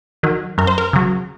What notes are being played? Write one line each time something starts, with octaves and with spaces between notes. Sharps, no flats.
D#3 F#3
F#2 A#4
C5
A#4
C#3 F#3